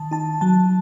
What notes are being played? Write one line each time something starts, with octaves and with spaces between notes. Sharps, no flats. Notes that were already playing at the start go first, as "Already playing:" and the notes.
Already playing: D#3 A5
D#4 A5
F#3 A5